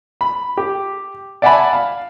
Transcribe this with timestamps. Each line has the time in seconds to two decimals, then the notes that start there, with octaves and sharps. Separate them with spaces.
0.21 B5
0.57 G4
1.42 D5 E5 F#5 G#5 A5 B5
1.73 F5